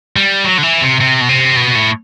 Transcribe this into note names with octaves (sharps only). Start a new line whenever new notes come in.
G3
F#3
D3
E3
C3
C3
B2
C3
B2
A2